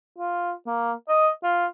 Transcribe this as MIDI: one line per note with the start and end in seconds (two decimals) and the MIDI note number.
0.18 0.53 65
0.67 0.92 58
1.09 1.29 75
1.43 1.66 65